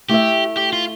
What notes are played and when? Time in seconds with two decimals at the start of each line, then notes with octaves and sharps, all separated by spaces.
0.09 A3 E4 G4 A4 E5
0.57 G4
0.73 F4